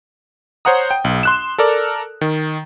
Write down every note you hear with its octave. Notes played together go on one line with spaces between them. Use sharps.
C5 C#5 F#5 A#5 D#6
G5
B1
C6 F#6 E7
A4 A#4 D5
D#3